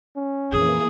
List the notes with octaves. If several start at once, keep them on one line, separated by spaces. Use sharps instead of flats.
C#4
F2 A#2 E3 A#3 G#4